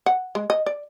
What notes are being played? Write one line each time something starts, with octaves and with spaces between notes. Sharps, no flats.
F#5
G#3
D#5
D5